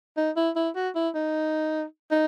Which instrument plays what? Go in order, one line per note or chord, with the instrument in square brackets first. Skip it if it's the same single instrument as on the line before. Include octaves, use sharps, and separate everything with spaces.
[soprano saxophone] D#4
E4
E4
F#4
E4
D#4
D#4